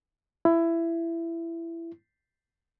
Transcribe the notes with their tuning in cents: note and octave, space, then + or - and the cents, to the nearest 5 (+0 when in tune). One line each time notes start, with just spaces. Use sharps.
E4 +20